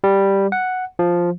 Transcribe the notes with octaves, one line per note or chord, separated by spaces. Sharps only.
G3
F#5
F3